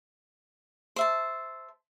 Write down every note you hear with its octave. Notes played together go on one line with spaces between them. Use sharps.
C5 E5 A5